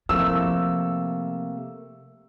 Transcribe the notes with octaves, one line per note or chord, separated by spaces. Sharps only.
C3 F3 A3 A#3 E6